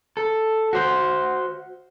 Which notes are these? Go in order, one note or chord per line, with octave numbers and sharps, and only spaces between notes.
A4
F#4 C5